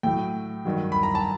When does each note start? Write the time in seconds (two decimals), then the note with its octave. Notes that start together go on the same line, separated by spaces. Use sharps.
0.03 A2 F#3 G5
0.65 G2 D#3 F#3
0.92 B5
1.03 A#5
1.15 A5